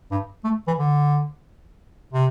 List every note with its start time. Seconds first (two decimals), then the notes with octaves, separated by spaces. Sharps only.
0.12 G2
0.44 A3
0.67 E3
0.78 D3
2.13 C3